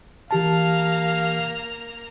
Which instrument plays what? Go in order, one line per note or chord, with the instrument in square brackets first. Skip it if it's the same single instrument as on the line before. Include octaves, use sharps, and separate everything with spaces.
[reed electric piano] E3 G4 A5 [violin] A#3 A#5 [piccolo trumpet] F5